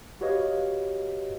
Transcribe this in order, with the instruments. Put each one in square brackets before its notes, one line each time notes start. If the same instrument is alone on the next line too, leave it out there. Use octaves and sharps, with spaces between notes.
[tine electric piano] F#4 G4 B4 C#5 D#5 F5